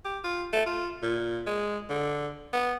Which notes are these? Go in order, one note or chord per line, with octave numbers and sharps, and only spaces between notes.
G4
F4
A3
F4
A#2
G#3
D3
B3